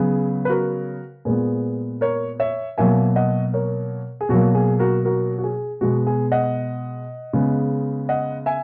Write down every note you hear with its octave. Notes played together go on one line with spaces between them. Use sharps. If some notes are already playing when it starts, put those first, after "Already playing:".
Already playing: C#3 F#3 B3 G#4
B4
F#4 A#4
A#2 G#3 B3 G#4 B4
A#4 C#5
C#5 E5
B2 F#3 A#3 E5 G#5
D#5 F#5
A#4 C#5
G#4
B2 F#3 A#3 F#4
G#4
F#4 A#4
F#4 A#4
F#4
G#4
B2 G#3 B3 F#4
G#4
D#5 F#5
C#3 G#3 B3
D#5 F#5
E5 G#5